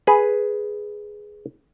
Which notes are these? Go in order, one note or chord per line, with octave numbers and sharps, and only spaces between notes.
G#4 B4